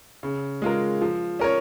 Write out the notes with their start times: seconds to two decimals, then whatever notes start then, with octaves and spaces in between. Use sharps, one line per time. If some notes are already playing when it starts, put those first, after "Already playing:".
0.23 C#3
0.62 G#3 F4 A#4
1.01 F3
1.39 C#4 A#4 C#5